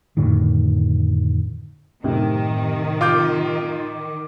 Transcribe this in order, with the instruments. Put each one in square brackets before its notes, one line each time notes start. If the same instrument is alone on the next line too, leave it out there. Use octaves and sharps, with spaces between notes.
[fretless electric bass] F2 A2 D3 D#3
[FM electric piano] F#2 A2 [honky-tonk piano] C3 [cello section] D#3
[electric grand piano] F4 D6 G6